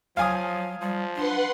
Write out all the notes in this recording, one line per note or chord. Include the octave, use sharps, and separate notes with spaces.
F3 F#3 F5 G#5 D#6
F3 G3
D4 B4 F#5 C6